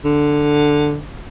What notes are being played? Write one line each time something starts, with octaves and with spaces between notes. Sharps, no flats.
D3